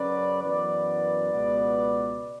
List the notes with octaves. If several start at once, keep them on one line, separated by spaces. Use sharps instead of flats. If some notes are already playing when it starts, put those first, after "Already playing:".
Already playing: F#2 C#3 F#3 C#4 B4 D5
F#2 E3 B3 B4 D5
C#2 B2 G#3 B3